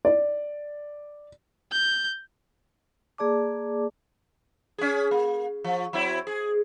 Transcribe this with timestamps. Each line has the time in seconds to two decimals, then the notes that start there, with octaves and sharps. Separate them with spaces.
0.05 D5
1.72 G6
3.18 A#3 G#4 D5 A5 D6
4.78 C#4 G#4
5.11 A#3
5.64 F3
5.93 F#3 C4 E4
6.27 G#4